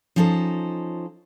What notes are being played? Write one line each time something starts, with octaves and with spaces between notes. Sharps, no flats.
F3 C#4 D#4 A4 C5